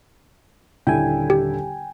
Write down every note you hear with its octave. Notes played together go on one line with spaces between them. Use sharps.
D#1 D3 E4 G5 G#5
G4